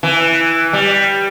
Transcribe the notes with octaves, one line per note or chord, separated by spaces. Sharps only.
E3
G3